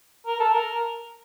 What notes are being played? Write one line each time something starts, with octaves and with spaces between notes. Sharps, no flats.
A#4
A4
A#4